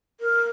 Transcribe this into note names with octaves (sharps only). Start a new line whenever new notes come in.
A#4